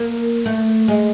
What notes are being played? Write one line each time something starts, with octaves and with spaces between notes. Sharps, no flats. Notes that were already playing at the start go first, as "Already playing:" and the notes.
Already playing: A#3
A3
G#3